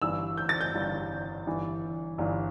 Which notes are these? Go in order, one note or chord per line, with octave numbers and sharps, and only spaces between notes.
G1 G2 E3 E6
G6
A6
G6
G1 G2 E3
G1 G2 E3
G1 G2 E3